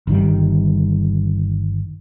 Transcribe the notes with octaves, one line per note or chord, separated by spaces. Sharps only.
G1 D#3 G3